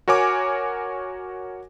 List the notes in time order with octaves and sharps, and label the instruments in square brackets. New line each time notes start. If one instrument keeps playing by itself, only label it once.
[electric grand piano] F#4 A#4 C#5 G#5 D6